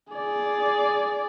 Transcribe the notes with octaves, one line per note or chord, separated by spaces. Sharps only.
G#4 D5